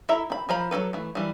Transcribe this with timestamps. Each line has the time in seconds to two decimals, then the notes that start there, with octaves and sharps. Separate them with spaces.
0.09 E4 A4 E5 A#5
0.30 C4 B5
0.49 F3 F4 C5 A#5 B5
0.71 F#3 C#4 A4 B4
0.93 E3 A3
1.15 E3 G3